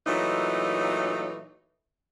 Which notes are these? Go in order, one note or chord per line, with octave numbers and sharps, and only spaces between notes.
A#2 E3 F#3 A3 D#4